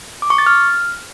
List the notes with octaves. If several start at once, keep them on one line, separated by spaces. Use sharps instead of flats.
D6
C#6
A6
F6